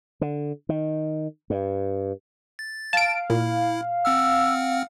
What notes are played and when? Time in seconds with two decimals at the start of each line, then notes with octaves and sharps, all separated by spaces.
0.21 D3
0.69 D#3
1.50 G2
2.59 A6
2.93 F5 A5 D7
3.30 A#2 E4
4.05 C4 F#5 E6 F6